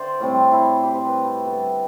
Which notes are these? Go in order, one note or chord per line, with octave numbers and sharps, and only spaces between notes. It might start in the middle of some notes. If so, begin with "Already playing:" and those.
Already playing: D3 C5 D5 E5 G5
A2 G3 C4
E4
G4
C5
B4
G4
D3 G3 B3 A4